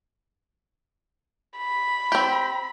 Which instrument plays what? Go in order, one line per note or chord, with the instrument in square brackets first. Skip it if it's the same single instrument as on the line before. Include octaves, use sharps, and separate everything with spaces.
[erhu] B5
[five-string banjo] C4 G4